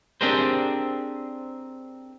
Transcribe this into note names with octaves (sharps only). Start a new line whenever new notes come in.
C4 D4 G4 G#4 A#4 C5